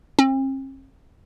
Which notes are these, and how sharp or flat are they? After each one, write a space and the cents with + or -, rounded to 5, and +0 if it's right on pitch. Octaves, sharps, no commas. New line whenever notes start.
C4 +45